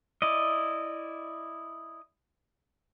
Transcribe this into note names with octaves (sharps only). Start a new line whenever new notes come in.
E4 D5 D#5